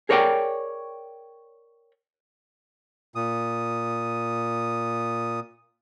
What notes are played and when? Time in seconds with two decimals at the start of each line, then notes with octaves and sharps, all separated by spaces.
0.09 G#4 A#4 C#5 D5 E5 G5
3.15 A#2 D#6